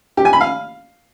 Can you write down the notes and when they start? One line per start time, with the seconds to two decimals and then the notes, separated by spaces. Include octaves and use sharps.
0.17 G4
0.25 G#5
0.33 B5
0.41 F5